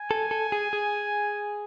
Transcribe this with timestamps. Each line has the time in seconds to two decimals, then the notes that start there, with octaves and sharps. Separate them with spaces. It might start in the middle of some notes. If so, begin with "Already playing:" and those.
Already playing: G#5
0.11 A4
0.31 A4
0.52 G#4
0.73 G#4